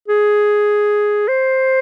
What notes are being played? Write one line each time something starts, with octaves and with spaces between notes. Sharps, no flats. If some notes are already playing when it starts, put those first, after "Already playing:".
G#4
C5